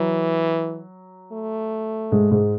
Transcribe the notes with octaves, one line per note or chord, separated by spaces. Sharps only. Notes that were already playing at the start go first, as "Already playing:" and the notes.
Already playing: E3 F#3
A3
G#2 G#3
G#2 G#3